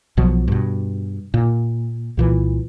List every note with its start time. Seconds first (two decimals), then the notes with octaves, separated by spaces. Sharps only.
0.17 B1 B2 F3 F#3
0.48 G2 B2
1.34 A#2
2.17 C2 A#2 E3